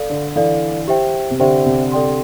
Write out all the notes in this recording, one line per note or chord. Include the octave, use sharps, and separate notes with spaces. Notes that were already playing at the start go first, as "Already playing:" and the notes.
Already playing: A4 D5 F5
D3
E3 A4 D5 F5
G4 C5 E5 G5
C3
D3 G4 C5 E5 G5
C3
A4 D5 G5 C6